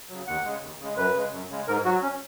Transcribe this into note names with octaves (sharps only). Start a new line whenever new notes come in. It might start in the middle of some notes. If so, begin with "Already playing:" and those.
C#3 F#3
D#2 F#5
C#3 G#3
D#2
C#3 G#3
F#2 B4
C#3 G#3
F#2
C#3 G#3
G#2 A#4
F#3 F#4
C#4